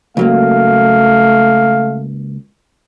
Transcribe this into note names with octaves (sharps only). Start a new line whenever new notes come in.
C#2 F#3 A3 A#3 F5